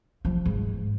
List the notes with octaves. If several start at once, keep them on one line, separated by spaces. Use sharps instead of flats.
F3
G#2